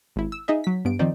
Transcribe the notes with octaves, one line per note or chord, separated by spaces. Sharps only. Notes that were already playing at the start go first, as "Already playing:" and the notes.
G#1 E4
E6
D#4 G#4 D#5 E5
F#3 B6
G2 B3 D7
D#3 F3 C4 D#4 C5 D5